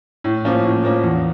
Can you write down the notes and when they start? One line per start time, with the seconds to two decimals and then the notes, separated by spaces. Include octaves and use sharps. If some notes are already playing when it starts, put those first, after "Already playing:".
0.24 A2
0.45 F3 A#3 C#4
0.64 A2
0.84 F3 A#3 C#4
1.03 E2